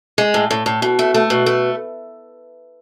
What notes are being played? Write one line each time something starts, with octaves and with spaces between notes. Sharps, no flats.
G#3
A2
A2
A2
B2
A3
A3
B2
A3